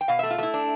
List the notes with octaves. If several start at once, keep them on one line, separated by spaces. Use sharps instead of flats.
G5
B2 F5
A3 E5
F4
A3 E4
D4